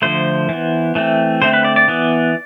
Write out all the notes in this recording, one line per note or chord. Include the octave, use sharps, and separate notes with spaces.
D3 F3 A3 C5
E3 B3
E3 A3 C4
D3 A3 C4 C5
B4
D5
D5
E3 B3